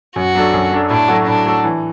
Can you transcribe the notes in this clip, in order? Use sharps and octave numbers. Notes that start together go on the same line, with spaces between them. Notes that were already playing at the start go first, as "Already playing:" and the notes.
F#2 F#4
F#3 D4 A4
F#2
F#3 D4 A4
A2 D4
F#3 A3 F#4 A4
A2 D4
F#3 A3 F#4 A4
E3